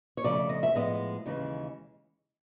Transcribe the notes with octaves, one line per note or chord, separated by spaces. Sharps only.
C#5
F2 C#3 F3 A3 D5
D#5
E5
A2 F3 G#3 B3 D#5
D#2 C#3 E3 G#3